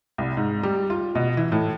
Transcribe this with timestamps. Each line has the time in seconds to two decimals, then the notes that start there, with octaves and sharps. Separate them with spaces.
0.18 C2
0.37 G#2
0.63 G3
0.90 F4
1.15 B2
1.37 E3
1.52 A2